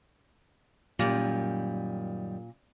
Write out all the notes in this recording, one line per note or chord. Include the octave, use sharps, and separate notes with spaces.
F#2 A#2 D#3 G3